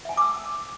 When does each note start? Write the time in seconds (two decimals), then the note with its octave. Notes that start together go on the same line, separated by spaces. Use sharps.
0.05 E5
0.09 G#5
0.13 A5
0.17 D6
0.21 E6